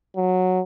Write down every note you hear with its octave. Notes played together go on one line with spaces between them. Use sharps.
F#3